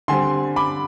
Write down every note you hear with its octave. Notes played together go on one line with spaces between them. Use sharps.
D3 G3 C4 G#5 C6
B5 D6